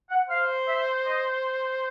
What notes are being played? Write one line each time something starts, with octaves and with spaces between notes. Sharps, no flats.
F#5
C5 F5
E5
D#5